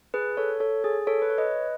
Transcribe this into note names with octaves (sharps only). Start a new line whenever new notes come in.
G#4 B4
A4 C#5
A4 C#5
G#4
A4 C#5
B4
C#5
B4 D#5